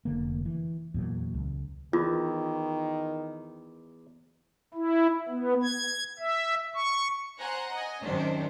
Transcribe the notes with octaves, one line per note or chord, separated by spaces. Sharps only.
F1 D3 A#3
E3
E2 A#2 F#3
C#2
E2 D#3 F4
E4
B3
G#6
E5
C#6
C5 F#5 G#5 A#5 F#6
D#5 G#5
F#2 C3 D#3 C#4 D4 C5